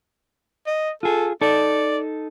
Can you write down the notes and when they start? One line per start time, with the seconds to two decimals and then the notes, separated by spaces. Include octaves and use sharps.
0.66 D#5
1.03 F4 G#4 A4
1.41 D#4 A4 D5